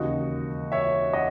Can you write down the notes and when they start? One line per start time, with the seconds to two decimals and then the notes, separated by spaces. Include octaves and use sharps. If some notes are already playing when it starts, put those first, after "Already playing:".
Already playing: E1 D#2 C#3 D#4 F#4
0.72 C#5 E5
1.13 D#5 F#5